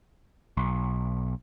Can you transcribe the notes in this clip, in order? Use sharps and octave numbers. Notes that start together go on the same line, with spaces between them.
B1